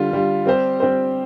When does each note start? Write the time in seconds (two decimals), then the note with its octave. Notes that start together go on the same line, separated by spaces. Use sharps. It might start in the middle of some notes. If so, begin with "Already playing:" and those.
Already playing: D3 G3 F4
0.11 D3 G3 F4
0.46 G3 C4 G4 C5
0.80 G3 C4 G4 C5